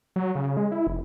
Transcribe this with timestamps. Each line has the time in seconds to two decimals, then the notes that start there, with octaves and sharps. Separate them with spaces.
0.16 F#3
0.35 C#3
0.57 G#3
0.72 E4
0.87 F1